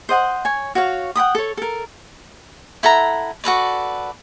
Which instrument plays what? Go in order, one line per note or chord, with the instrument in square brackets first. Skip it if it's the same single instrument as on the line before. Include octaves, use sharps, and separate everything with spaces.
[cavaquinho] C5 D#5 F#5 C6
C#5 G#5
F#4 C#5 F5
F#5 G5 B5 D#6
A4 C#5
A4 A#4
E4 A4 F#5 A#5
F#4 A4 B4 D5